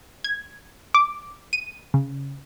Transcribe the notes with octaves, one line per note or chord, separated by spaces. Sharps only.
G#6
D6
D#7
C#3